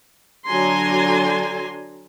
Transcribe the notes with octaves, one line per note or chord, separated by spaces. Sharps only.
D3 F#3 D4 G#5 A#5 C6